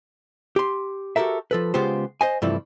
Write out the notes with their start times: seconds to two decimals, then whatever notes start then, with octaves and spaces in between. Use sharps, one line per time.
0.56 G4 C6
1.16 F#4 G4 A4 A#4 E5
1.51 F3 A4 B4
1.74 C#3 G#3 B3 F4 G4 C5
2.21 C5 D#5 G#5
2.42 G2 C3 E3 F3 A3 E4